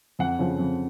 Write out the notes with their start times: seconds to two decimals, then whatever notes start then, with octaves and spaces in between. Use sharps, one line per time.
0.19 F2 F#5
0.39 C#3 F3
0.59 F2